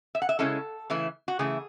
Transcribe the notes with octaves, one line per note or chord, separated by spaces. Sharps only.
E5
F#5
E5
C#3 G#3 C#4 E4 A4
C#3 E3 A3 E4
F#4
C#3 E3 A3 E4 G#4